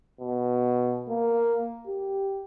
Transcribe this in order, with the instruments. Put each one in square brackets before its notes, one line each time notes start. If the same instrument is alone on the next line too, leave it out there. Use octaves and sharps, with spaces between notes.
[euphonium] B2
A#3
G4